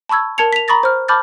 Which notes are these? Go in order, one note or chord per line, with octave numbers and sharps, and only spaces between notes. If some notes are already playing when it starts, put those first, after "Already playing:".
A5 B5 C#6 E6 G#6
A#4 A5 G#6 C#7 F7
B6 F7
A#5 B5 C#6 D#6 A6 A#6
C5 F6
A5 B5 D6 F6 G6 A6